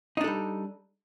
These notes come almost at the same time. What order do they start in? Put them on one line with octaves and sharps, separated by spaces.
D#4 D4 A4 G3